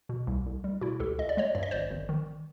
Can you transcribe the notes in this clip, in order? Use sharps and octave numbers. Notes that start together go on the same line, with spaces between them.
B2
C2
C2
G3
B2 E4 F#4
C#2 G4 A4
C#2 D#5
D5
G#3 C#5 D#5
G2 D5
D#5
G#1 C5 D5
G#1
D#3